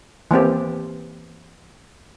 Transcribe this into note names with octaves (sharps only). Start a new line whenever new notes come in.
E3 A#3 C4 G4